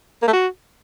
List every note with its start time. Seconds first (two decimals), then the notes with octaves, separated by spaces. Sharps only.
0.22 A#3
0.27 A3
0.33 F#4